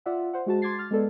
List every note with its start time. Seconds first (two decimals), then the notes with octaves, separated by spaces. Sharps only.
0.06 F4 D5 E5 F#5
0.33 C5 F#5
0.46 G#3 F#4 A5
0.62 C6 D6 G#6 A6 C7
0.79 F6 A6
0.91 G#3 B3 A4 D5